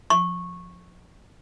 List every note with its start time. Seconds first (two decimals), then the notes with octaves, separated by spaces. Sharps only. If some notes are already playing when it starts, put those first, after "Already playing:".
0.10 C#6